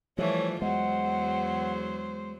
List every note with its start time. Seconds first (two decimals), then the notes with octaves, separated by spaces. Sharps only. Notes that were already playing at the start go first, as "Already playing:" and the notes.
0.18 E3 F3 G3 A3 F4 C#5
0.62 E2 F#3 G#3 C5 F#5